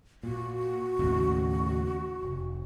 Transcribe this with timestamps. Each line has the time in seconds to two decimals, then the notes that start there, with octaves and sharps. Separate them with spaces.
0.23 A#2 F#4
0.99 D#2 A2 C#3
2.23 F1